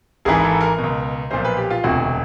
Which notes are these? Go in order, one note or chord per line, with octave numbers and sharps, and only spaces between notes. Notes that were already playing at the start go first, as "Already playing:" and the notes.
G#1 G#2 E3 G#4
A4
A#4
B2
C#2
B1 A#2 F3 C5
B4
G4
F4
E1 D2 C3 F#4